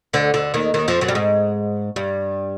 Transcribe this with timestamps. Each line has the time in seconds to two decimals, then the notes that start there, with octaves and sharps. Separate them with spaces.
0.13 D2 D3
0.34 D2 D3
0.54 D#2 D#3
0.74 D#2 D#3
0.88 F2 F3
1.01 F#2 F#3
1.08 G3
1.15 G#2 G#3
1.96 G2 G3